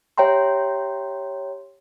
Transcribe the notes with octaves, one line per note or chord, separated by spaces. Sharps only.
G4 C#5 E5 G5 A#5 C6